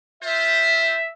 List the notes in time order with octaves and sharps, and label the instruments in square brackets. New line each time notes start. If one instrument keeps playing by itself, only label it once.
[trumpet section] F4 C5 [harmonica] E5